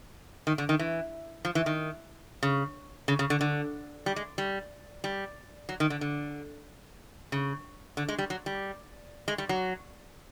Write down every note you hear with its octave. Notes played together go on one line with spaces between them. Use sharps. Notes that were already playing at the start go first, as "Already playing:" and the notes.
D#3
D3
D#3
E3
F3
E3
D#3
C#3
C#3
C#3
D3
D3
G3
G#3
G3
G3
F#3
D#3
D3
D3
C#3
D3
G#3
G3
F#3
G3
G#3
G3
F#3